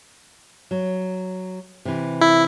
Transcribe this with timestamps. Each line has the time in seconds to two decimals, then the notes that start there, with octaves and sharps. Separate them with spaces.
0.71 F#3
1.85 C3 E3
2.21 E4